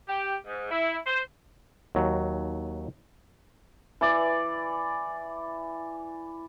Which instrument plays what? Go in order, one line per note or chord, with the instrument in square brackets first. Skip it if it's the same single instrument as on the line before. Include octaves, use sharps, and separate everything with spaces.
[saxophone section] G4
G#2
E4
C5
[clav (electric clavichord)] D#2 F#3
[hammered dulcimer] E3 D5